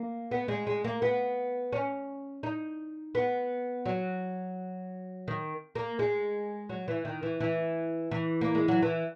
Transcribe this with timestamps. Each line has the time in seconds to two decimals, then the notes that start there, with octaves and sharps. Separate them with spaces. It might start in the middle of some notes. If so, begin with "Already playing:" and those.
Already playing: A#3
0.31 B3
0.48 G#3
0.67 G#3
0.84 A#3
1.02 B3
1.73 C#4
2.43 D#4
3.15 B3
3.85 F#3
5.28 D#3
5.75 A#3
5.99 G#3
6.69 F#3
6.88 E3
7.05 D#3
7.23 E3
7.40 E3
8.11 E3
8.41 A#3
8.55 G#3
8.68 F#3
8.82 E3